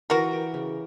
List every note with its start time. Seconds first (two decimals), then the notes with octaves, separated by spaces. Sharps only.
0.10 E3 F#4 A#4
0.33 G4
0.54 C#3